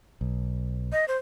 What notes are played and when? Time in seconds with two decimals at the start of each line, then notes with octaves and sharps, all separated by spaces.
0.21 B1
0.92 D#5
1.08 C5